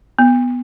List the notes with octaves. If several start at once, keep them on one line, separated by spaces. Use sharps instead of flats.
B3